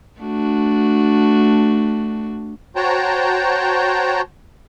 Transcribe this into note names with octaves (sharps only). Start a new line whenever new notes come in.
A3 D4 F#4
F#4 C5 C#5 G5 A5 A#5